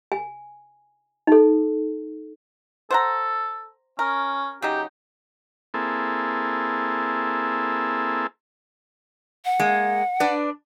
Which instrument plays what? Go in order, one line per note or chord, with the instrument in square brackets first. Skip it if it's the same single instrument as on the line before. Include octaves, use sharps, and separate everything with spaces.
[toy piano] G#5
D#4 A4
[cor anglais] A4 [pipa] C5 F#5 A#5
[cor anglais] C#4 [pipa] A#4
[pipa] C#3 F#3 D#4 [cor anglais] G4
[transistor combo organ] A#3 C4 E4 G#4 A4
[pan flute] F#5
[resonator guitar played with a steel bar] G#3 A#3
D4 B4 D5